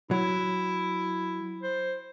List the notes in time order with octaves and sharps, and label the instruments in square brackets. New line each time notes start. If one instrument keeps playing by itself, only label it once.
[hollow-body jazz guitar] F#3 [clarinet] E4
[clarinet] C5